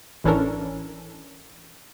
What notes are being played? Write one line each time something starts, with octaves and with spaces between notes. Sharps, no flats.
A1 E3 C#4 D4 A4 A#4